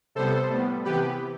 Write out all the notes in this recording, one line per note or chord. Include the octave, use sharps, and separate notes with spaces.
C3 G3 B3 A4 C5
A2 G3 B3
C3 E3 B3 G4 B4